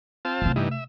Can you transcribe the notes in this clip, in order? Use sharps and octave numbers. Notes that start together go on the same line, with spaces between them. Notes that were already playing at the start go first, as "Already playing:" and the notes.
C4 F4 A5
C3 A3
G2 E3 D#4
E5